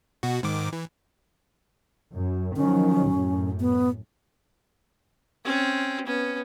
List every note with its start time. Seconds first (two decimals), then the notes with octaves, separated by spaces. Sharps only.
0.23 B2 F#4
0.43 G#2 D#3 D6
0.73 E3
2.15 F#2
2.56 D#3 F3 F#3 C#4
3.09 F#2 A2
3.60 B3
5.45 C4 C#4
6.06 B3 C#4